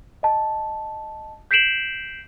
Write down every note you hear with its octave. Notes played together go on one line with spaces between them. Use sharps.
D#5 A5
G6 B6 C7 D7 E7 F#7